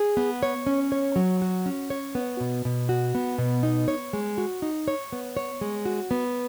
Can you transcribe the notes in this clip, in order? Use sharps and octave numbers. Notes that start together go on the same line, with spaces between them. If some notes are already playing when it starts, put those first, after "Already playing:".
Already playing: G#4
B3
C#5
C#4
C#5
F#3
F#4
C#4
C#5
B3
B2
B2
F#4
B3
B2
D#4
C#5
G#3
F#4
D#4
C#5
B3
C#5
G#3
F#4
B3